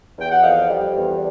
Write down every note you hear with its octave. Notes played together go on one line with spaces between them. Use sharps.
E2 G5
F#5
F2 D#5 F5
G3
E2